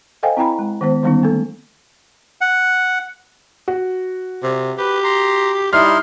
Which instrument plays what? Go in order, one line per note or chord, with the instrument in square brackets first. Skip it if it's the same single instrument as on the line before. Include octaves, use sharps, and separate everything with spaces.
[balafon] A4 C5 D#5 F5 G5 G#5
C4 E4 G5 A#5 B5
G#3
D#3 G#3 B3 C5
D3 D#3 G3 B3 C#4 D#4
A3 A#3 A4
[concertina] F#5
[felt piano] F#4
[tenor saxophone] C3
[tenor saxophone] G4 [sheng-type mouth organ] B4
[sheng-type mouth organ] A#5 C6
[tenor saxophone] G3 [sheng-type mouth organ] D#4 E4 C6 [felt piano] E5 F6